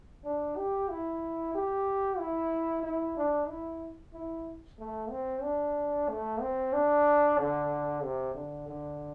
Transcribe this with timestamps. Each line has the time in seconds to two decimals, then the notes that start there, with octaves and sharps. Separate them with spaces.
0.24 D4
0.56 G4
0.89 E4
1.55 G4
2.18 E4
2.83 E4
3.17 D4
3.49 E4
4.13 E4
4.79 A3
5.10 C4
5.43 D4
6.09 A3
6.41 C4
6.73 D4
7.38 D3
8.04 C3
8.35 D3
8.68 D3